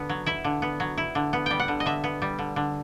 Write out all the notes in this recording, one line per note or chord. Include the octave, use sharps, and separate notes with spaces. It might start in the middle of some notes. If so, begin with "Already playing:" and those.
Already playing: D3 B3
F#3
E4 E5
D3
B3
F#3
E4
D3
B3
G3 G5
F#5
D3
D#5
D3 E5
B3
G3
D3
D3